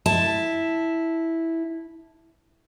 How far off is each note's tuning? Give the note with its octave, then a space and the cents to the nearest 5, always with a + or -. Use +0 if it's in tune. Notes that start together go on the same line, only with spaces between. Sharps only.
E4 -5 A5 +0